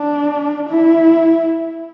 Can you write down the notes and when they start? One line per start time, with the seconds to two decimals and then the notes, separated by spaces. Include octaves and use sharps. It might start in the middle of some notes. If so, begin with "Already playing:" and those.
Already playing: D4
0.68 E4